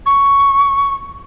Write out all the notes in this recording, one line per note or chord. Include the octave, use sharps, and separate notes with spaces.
C#6